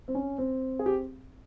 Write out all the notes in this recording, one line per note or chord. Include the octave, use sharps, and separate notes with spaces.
C4
C#4
C4
G#4
G4